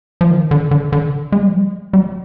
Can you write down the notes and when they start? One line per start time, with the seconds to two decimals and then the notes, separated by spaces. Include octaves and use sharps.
0.21 F3
0.31 D#3
0.51 D3
0.71 D3
0.92 D3
1.32 G#3
1.40 G3
1.47 F3
1.54 G3
1.93 G3